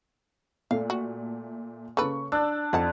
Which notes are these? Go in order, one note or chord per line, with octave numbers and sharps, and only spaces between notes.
A#2 A3 F5
F#4
C#3 A#3 A4 B4 C#6
D4 E6 F#6
F2 D#4 F#5 A5